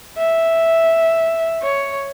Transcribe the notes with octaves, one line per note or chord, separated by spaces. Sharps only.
E5
C#5